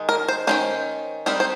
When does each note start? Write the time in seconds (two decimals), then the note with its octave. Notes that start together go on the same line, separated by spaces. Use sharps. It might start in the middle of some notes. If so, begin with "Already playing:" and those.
Already playing: D#3 G#3
0.09 A#4
0.28 C5
0.47 D#3 A#3 C#4 C5
1.26 G3 C4 D#4 A#4
1.40 C5